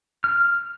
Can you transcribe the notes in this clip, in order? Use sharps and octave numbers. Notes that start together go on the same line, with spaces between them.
F6